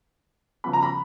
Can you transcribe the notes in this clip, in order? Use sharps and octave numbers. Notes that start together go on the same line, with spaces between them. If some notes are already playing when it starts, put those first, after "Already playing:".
C#3 F3 B3 B5
A#5
B5